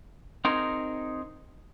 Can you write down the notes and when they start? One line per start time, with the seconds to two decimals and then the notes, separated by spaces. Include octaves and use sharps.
0.45 C4 D#4 G#4 A#4